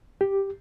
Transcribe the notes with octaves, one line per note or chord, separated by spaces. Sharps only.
G4